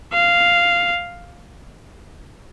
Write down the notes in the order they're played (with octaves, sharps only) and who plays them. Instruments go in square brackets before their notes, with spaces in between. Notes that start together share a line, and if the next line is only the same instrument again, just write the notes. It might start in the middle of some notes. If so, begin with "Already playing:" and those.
[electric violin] F5